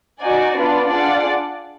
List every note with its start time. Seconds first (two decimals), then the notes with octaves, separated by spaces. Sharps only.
0.20 D#4 F#4 D5 G#5
0.56 B3 D4 F4 B4 D5
0.90 D4 F4 G#4 D5 F#5